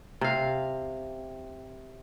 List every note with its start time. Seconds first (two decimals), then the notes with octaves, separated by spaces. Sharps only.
0.21 C3 F5